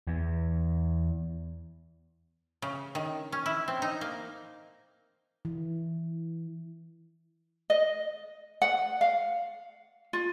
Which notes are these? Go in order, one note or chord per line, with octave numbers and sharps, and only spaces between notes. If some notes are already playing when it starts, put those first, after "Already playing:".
E2
C#3
D#3
C#4
E4
C4
D#4
A#3
E3
D#5
F#5
F5
F4